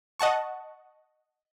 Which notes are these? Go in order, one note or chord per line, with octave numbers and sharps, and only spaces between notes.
D#5 F#5 A5 C#6